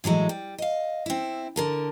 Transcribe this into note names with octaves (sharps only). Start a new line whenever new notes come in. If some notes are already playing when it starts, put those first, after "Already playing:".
A2 E3 F#3 G#3
G3
D#5 F5
C4 E4
D3 A#4 A5